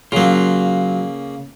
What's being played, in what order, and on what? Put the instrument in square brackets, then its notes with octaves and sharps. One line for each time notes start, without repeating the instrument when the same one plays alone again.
[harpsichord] C#3 A#3 [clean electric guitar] F#3 F4